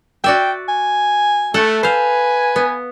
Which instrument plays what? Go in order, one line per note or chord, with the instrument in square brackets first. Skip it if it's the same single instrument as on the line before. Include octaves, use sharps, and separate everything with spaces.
[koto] F#4 D5 E5 [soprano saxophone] G5
[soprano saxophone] G#5
[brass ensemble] A3 [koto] A4 F#5
[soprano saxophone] B4 [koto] C5 F5 [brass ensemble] G#5
[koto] B3